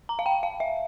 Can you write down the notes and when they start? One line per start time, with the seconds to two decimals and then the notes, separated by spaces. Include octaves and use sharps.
0.09 A#5
0.19 F5
0.26 G5
0.43 F5
0.60 E5